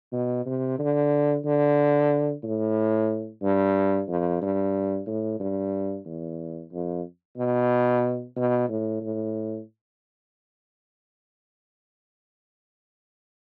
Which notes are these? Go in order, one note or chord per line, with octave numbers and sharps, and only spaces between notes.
B2
C3
D3
D3
A2
G2
F2
G2
A2
G2
E2
F2
B2
B2
A2
A2